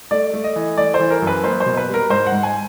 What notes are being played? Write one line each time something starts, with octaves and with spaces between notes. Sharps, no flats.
A3 D5
A3
D#5
E3
A3 D5
C5
E3
A#4
F#2
B4
A#3 C5
C5
B2
B4
G3
A#4
G#2 C5
F#5
G#2
G#5